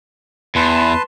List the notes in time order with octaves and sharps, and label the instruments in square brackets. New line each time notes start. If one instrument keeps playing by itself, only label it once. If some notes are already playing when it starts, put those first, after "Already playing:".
[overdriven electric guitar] E2 [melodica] B4 A5 C6